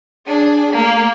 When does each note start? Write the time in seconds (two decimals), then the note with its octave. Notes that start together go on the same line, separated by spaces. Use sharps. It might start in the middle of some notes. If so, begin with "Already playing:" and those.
0.25 D4 G#4
0.71 A3 A#3